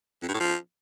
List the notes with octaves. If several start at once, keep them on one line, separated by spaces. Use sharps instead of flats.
F2
G2
A2
F3